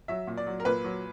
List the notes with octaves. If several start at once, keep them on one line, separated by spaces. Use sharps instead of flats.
F#3 E5
A#2
D5
F#3
A#4
A#2 B4
F#3